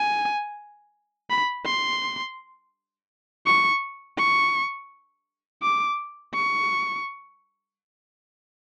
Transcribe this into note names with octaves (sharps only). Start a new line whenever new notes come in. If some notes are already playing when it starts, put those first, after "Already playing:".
Already playing: G#5
B5
C6
C#6
C#6
D6
C#6